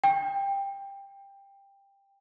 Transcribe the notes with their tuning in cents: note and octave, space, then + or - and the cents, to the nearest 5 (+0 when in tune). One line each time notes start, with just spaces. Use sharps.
G5 +15